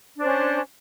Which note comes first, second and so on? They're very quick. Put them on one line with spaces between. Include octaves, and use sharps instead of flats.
D4 C5 C#4